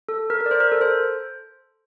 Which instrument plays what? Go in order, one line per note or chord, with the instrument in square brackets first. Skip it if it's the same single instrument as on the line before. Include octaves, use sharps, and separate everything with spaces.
[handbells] A4
A#4
A#4
D5
C5
A#4
A4
C5